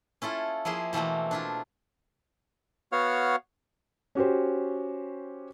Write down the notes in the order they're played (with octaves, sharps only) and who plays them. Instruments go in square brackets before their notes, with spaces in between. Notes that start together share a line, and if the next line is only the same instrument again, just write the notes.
[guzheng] C#4 E4 F4 A4
F3 A#3 E4 G#4 C6
B2 E3 A3 A#3 C4
D4 E4 F4
[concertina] B3 F#4 C#5 F5 F#5 F6
[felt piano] C#4 F#4 G4 C5